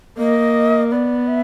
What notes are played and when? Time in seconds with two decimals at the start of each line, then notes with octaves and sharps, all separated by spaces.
0.18 A#3 D#5
0.91 B3 D5
1.28 E5